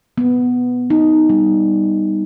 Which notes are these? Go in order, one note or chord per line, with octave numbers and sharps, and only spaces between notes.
B3
D#4
G3